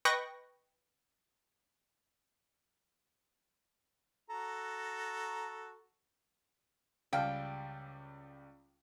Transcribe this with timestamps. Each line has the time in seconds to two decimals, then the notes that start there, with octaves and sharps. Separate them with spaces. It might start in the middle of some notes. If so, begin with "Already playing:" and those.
0.05 B4 D#5 G5 C#6 F#6 A#6
4.30 F#4 A4 A#5
7.13 C#2 G3 F5 G5 F6 G6